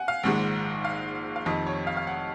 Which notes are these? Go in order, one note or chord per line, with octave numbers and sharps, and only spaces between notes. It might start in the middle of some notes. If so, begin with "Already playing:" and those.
Already playing: F#5 G#5
F5
A#1 G#2 D#3 G#3 F#5
F5
F5
F1 F2 D#3 D#5
C#5
F5
F5
F#5